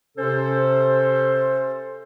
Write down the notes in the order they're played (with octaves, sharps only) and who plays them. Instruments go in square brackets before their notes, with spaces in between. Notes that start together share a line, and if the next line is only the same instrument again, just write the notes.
[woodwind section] C3 C#4 A4 C5